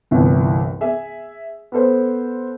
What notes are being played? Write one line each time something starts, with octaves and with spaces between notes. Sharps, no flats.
G1 C2 E3
G#4 E5
B3 A4 C5